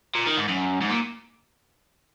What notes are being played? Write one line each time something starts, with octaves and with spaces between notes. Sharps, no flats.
A#2
D#3
G#2
F#2
G#2
A#2